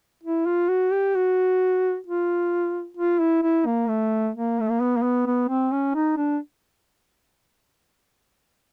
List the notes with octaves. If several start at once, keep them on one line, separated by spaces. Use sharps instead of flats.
E4
F4
F#4
G4
F#4
F4
F4
E4
E4
A#3
A3
A#3
A3
A#3
B3
A#3
B3
B3
C4
C#4
D#4
D4